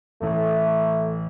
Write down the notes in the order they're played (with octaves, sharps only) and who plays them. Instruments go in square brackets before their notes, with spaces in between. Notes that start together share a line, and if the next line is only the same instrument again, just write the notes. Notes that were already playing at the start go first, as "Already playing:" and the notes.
[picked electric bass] A1 A2 E3 [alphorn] A3